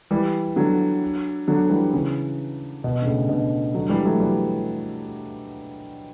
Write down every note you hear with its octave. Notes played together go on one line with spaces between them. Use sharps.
E3 G3
D3 F#3
D3 F#3
E3 G3
C#3 E3
B2
D3
A2 C#3
B2 D3
D3 F#3
E3 G3
F#3 A3
E3 G3